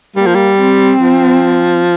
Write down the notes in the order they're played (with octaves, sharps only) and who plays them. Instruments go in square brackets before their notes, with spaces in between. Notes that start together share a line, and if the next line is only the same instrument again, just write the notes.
[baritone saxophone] G3 [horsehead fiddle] A#3
[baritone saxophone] F3
G3
[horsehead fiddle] C4
[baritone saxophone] F3